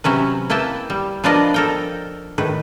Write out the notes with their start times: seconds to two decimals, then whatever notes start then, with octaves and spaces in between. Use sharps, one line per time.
0.04 C3 F#3 C#4 B4
0.50 A#3 E4 B4 G5 A5
0.90 G3
1.24 F3 B3 D4 A#4 D5 D#5
1.54 A4 A#4 G5
2.38 A2 D#3 B4